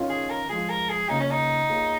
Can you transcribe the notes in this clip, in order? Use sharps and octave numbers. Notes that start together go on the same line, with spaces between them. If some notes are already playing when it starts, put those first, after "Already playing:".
Already playing: D#3 C#4 F4
G#4
A#4
F3 G#3 F4 G#4
A#4
G#4
C#3 A#3 D#4 F4 A#4 C#5
C#4
D#4
A#3 F4 G#4 C#5